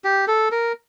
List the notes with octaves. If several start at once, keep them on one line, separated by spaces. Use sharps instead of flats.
G4
A4
A#4